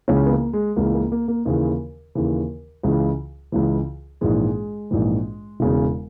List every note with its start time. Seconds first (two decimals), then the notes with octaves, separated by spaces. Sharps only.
0.08 C#2 C#3 E3 C#4
0.26 B3
0.31 A#3
0.53 G#3
0.76 C#2 C#3 E3 A#3
0.94 A#3
1.12 A#3
1.28 A#3
1.46 D#2 C#3 E3
2.15 D#2 C#3 E3
2.83 C#2 C#3 E3
3.52 C#2 C#3 E3
4.21 A#1 G#2 E3 G#3
4.91 A#1 G#2 E3
5.60 E1 E2 C#3 E3